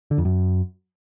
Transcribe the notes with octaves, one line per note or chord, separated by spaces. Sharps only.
D3
F2
F#2